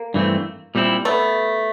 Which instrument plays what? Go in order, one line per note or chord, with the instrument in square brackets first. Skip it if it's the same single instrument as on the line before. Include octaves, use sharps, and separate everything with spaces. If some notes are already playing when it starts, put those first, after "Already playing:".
Already playing: [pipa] A#3
[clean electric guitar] G2 E3 A3 C4
A#2 G3 C4 E4
[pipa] A3 B3